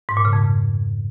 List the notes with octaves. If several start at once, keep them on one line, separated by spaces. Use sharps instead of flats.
G#2
A#2
C#3
F2